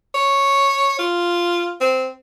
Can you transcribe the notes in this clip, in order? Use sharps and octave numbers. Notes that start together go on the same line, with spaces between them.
C#5
F4
C4